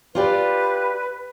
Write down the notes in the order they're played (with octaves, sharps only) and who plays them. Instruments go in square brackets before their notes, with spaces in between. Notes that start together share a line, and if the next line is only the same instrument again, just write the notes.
[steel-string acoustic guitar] F4 G4 D5 [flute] B4